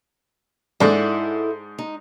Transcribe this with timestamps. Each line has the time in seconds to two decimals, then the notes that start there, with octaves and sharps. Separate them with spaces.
0.80 G#2 D4 E4 A4 F#5
1.79 D#4